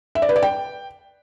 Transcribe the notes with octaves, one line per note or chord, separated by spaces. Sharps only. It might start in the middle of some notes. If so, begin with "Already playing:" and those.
E5
D5
B4
D5
G5